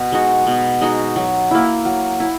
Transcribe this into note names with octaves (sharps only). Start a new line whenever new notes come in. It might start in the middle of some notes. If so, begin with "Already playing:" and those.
Already playing: B2
G#3 D#4 F#4
B2
G#3 D#4 F#4
F#3
A#3 E4
F#3
E4